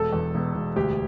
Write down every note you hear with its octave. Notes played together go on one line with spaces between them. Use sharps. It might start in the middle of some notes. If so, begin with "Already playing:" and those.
Already playing: E1 A4
E2
E1
E1
D2 G4